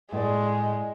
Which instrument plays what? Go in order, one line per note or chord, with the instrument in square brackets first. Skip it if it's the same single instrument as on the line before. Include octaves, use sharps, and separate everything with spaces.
[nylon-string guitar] A2 D5 [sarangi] G#3